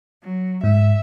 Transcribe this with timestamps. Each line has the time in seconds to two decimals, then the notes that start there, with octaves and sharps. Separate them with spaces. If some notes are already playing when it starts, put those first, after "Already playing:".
0.23 F#3
0.64 G#2 E5